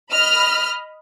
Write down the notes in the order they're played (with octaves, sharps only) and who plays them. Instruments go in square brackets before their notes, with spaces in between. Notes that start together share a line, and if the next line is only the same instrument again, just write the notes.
[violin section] D#5 B5 F6